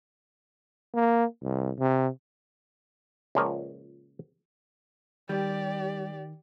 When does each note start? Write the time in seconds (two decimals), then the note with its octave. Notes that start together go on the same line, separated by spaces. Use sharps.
0.94 A#3
1.43 C2
1.79 C3
3.35 C#2 A#2 F3 A#3 A#4 C#5
5.29 D#3 G3 G4 D5